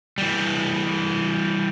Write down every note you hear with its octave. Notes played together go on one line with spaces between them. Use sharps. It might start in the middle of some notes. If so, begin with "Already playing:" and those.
E3 G3